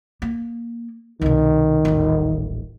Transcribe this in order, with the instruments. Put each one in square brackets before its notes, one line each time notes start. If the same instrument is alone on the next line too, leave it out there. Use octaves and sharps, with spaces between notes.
[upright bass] A#3
[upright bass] C2 B2 [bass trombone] D#3
[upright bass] D#1 A1